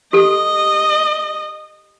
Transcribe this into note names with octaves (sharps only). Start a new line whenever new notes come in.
G4 A4 D#5